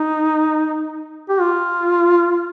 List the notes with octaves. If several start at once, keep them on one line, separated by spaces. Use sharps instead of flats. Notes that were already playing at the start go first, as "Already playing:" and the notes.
Already playing: D#4
G4
F4